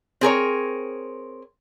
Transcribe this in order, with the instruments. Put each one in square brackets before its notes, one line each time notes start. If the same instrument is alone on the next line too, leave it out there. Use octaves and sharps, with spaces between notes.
[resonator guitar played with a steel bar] C4 G#4 A#4 C#5